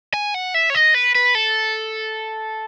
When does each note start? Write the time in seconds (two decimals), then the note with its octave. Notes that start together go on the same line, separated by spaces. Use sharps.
0.14 G#5
0.34 F#5
0.54 E5
0.70 C#5
0.75 D#5
0.94 B4
1.15 B4
1.35 A4